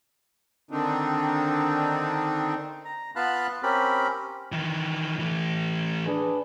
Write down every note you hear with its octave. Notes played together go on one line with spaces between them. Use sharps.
D3 D#3 C4 D4 D#4
A#5
B3 F4 F5 A5 B5 F#6
C4 C#4 G4 A#4 B5
D#3 E3
E3 A3
D4 G#4 B4